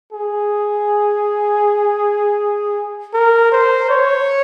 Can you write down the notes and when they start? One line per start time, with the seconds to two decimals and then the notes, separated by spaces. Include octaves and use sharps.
0.13 G#4
3.14 A#4
3.52 C5
3.90 C#5